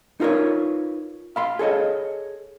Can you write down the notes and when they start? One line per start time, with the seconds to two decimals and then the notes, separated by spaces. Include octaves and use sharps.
0.20 D#4 F4 A#4 B4 C#5
1.36 F5 B5 C6
1.59 G#4 A4 C#5 D#5